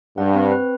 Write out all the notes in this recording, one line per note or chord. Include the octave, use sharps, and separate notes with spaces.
G2 F#5
C4
B4